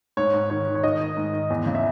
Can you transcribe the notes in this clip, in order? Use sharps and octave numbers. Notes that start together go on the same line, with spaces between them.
G#2 C#5
G#2
D#3 C#5
D#3
C#5
D#3 D#5
D#3
G#2
D#3
E2
C#3
E5